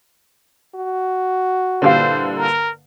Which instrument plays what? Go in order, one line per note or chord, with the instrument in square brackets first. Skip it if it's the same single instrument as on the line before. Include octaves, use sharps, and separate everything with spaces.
[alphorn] F#4
[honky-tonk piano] G2 A#2 D3 [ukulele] E4 G4 F5 [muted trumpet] C5
[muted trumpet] A#4